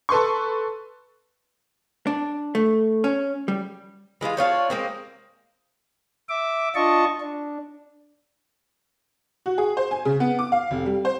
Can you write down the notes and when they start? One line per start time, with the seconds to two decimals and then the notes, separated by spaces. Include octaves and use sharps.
0.09 A4 B4 C6 C#6
2.07 D4
2.55 A3
3.04 C#4
3.48 G3
4.21 E3 G#3 A3 F4
4.37 D4 F4 C#5 G5
4.70 G#3 A#3 C4
6.29 E5 D6
6.75 D4 F4 D#5 A5 C#6
7.20 D4
9.46 F#4
9.58 G#4
9.77 C5
9.91 G#5
10.05 C#3
10.20 B3
10.39 D6
10.52 F5
10.71 F1
10.86 G3
11.05 C5